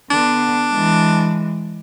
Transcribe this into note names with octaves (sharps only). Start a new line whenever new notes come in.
D3 B3 D4
E3 G#3